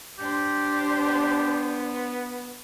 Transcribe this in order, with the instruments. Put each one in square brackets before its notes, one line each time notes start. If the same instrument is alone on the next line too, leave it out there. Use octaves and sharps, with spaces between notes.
[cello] D4 C5 [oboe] G4
[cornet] B3